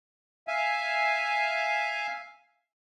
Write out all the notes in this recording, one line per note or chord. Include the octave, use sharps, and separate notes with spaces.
E5 F5 G#5